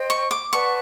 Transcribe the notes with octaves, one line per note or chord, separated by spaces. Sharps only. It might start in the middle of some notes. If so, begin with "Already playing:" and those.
Already playing: C5 D#5 G5
C#6
D6
B4 D5 F#5 A5 C#6